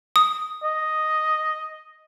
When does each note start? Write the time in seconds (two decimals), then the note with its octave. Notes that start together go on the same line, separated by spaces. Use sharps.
0.16 D#6
0.63 D#5